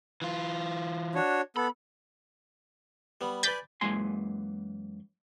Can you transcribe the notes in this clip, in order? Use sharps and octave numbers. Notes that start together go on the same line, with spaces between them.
E3 F4
D4 F#4 C#5
B3 A4 B5
G3 B3
B4 D5 G#5 G6 A6 B6
F#2 E3 G#3 A#3 G#5 C6